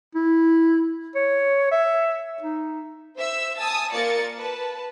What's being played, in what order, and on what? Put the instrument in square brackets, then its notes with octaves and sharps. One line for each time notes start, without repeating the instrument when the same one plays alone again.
[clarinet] E4
C#5
E5
D#4
[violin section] C5 E5 E6
G#5 A5 D#6 E6 A6
A#3 F4 A#4 D5 A6 C#7
B4 A5